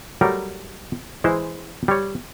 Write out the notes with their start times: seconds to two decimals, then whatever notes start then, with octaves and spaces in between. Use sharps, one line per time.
0.21 F#3 G3 A3 A#4
1.24 E3 G#3 E4 C5
1.88 G3 C#5